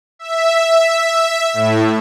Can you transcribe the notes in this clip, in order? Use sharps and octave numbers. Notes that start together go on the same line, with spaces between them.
E5
A2